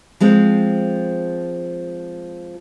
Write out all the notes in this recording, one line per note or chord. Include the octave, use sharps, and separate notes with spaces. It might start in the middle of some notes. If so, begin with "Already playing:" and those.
F3 G#3 C4